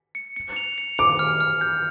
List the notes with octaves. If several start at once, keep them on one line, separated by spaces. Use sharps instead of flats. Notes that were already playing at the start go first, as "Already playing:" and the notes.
C#7
C#7
F7
C#7
D6 F7
F6
F6
G6